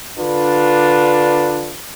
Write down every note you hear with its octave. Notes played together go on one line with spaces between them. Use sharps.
D3 D4 F4 B4